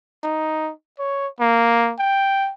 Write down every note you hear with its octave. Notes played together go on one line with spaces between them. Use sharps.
D#4
C#5
A#3
G5